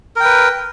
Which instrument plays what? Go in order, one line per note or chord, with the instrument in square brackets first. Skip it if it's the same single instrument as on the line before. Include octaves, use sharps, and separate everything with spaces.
[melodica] A#4
G5
B4